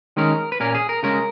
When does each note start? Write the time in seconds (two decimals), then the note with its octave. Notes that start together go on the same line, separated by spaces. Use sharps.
0.17 D#3 G#3 C#4 A#4
0.52 B4
0.60 A#2 A#3 C#4 A#4
0.75 G#4
0.89 A#4
1.03 C#3 G#3 C#4 A#4